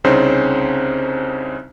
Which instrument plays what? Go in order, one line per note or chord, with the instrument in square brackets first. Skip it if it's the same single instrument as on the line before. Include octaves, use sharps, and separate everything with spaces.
[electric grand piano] C2 C#3 C4 C#4 D#4 C5